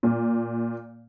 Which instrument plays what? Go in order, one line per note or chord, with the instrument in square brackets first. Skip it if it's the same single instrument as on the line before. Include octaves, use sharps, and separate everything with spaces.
[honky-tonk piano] A#2